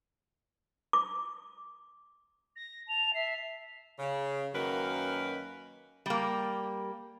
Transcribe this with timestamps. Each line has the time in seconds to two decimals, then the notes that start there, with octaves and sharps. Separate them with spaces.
0.93 D6
2.56 A#6
2.88 A5 F7
3.14 E5 C7
3.98 C#3
4.54 F#2 D#3 F#3 A#3 A#4 B4
6.06 G3 A#3